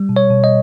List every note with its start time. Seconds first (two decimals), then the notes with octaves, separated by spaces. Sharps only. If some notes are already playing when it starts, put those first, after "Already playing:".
Already playing: G3
0.09 B2
0.16 C#5
0.30 B2
0.44 D#5